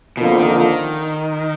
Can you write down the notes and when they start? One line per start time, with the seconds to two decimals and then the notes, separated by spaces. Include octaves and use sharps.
0.17 F2 B2 D3 F3 A#3 F4
0.38 D#3
0.60 D#3